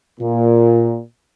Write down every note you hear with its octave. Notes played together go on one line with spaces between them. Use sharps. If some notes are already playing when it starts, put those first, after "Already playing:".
A#2